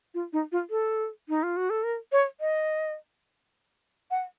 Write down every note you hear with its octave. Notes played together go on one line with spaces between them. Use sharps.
F4
D#4
F4
A4
D#4
F4
F#4
A4
A#4
C#5
D#5
F#5